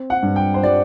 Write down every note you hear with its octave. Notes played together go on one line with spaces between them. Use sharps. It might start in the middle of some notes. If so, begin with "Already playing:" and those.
Already playing: C4
F#5
G2
G5
C5
G3 D5